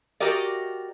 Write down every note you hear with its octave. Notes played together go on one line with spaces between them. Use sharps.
F#4 G4 A#4 D5 D#5